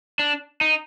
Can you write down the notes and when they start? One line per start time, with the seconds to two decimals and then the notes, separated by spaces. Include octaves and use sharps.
0.19 D4
0.61 D#4